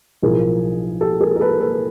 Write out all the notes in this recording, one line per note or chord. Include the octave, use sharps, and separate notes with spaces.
B1 A2 F3 G#4 A#4
G4 A4
G#4 A#4
A#4
A4 B4
A4 B4